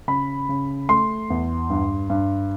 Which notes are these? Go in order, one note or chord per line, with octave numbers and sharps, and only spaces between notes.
C#3 B5
C#3
A3 C6
E2
G2
G2